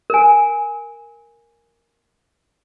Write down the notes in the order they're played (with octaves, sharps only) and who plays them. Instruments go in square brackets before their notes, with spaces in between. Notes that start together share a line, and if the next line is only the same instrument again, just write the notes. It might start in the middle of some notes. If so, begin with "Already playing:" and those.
[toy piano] A#4 G#5